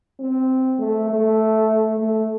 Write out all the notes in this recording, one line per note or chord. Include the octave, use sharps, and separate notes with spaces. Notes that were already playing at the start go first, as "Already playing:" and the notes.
C4
A3
A3
A3